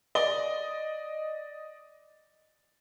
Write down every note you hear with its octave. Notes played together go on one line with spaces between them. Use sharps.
D5 D#5 G7